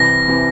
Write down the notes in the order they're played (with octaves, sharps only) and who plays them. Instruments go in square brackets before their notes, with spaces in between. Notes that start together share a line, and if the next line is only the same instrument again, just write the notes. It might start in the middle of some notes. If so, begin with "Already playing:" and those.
Already playing: [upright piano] C2 C3 E3 [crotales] A#6
[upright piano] C3 E3